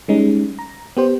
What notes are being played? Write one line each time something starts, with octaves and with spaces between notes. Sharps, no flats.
G3 G#3 C#4 D#4
A#5
B3 G4 C5